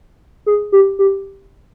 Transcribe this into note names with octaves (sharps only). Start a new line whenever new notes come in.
G#4
G4
G4